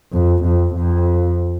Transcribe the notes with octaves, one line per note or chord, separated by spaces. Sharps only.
F2
F2
F2